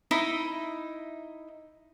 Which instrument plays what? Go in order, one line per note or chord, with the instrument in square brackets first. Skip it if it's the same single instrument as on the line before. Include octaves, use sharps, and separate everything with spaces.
[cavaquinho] D#4 E4 D#5 E5